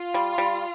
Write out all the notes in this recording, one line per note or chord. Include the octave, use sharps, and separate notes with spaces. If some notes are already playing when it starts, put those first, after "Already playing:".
Already playing: F4
G3
G3